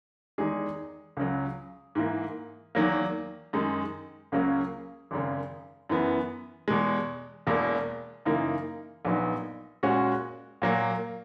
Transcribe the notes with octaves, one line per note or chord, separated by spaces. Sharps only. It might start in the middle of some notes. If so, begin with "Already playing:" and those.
E2 D#3 G#3 D#4 G#4
C#2 C#3 F#3
G#2 E3 A#3
E2 D#3 F#3 A#3
F#2 D#3 G#3 D#4
C#2 C#3 F#3 A#3 C#4
G#1 F#2 C#3
F#2 E3 B3
E2 B2 G#3
E1 E2 B2 A#3
F#2 C#3 E3 A#3 D#4
A#1 A#2 F#3 B3 D#4
A#2 G#3 C#4 F#4
A#2 F#3 A#3